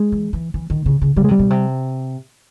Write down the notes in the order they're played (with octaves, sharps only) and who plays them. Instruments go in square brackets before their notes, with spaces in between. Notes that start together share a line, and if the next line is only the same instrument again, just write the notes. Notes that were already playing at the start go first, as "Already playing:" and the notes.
Already playing: [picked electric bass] G#3
[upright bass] E3
E3
E3
D#3
C#3
C#3
[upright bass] C#3 [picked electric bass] G3
[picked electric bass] G#3
[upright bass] C3 [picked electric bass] G3
[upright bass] B2
C3